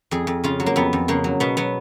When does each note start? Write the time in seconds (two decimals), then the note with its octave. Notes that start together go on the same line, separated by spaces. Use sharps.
0.11 F2 G#4
0.27 F2
0.44 C#3 F4
0.60 F#3
0.66 A#3
0.76 F2 B3
0.93 F2
1.08 C#3 A#3
1.24 F#3
1.40 B2 B3
1.57 F#3 B3